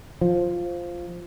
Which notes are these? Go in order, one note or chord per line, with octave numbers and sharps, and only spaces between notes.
F3